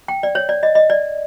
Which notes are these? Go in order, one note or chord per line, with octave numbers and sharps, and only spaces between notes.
G5
D5
C#5
D5
D#5
D#5
D5